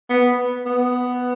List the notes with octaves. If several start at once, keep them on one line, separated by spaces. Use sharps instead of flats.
B3
B3